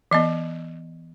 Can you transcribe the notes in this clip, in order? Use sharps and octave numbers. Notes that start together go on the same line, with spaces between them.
E3 B3 D#5